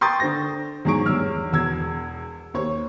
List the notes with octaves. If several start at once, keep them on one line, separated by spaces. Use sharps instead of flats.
G5 C6 C#6 D#6 G6 A6
D3 C5 A#6
E2 G#2 F#3 G#4 C#6 D7
E2 G2 C#5 E6 F6
E1 E2 E6 G#6
D#2 C5 C#5